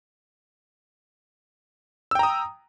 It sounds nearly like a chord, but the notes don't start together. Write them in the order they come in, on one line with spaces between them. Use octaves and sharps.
E6 G5 A#5 D#6